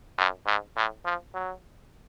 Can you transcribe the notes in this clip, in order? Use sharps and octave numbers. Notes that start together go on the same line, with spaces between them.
F#2
G#2
A2
F3
F#3